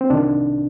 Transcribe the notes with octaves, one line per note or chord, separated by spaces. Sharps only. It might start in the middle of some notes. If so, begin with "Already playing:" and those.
C4
C2 C3 D#3 D4